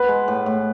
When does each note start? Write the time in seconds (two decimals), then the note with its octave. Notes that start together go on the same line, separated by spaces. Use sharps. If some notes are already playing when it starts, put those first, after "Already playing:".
Already playing: B3 B4
0.08 G#3
0.28 A2
0.46 A2